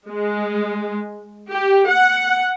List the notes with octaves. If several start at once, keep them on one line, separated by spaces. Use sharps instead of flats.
G#3
G4
F#5